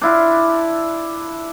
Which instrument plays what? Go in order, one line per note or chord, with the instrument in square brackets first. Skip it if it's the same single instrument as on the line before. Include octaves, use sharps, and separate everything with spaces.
[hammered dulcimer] D4 E4 F4